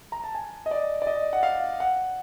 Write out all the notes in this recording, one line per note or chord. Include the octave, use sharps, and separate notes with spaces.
A#5
A5
G#5
D#5
D5
D5
D#5
F#5
F5
F#5